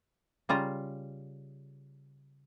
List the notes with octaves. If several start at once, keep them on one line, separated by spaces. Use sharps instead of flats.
C#3 G3 F4 A#5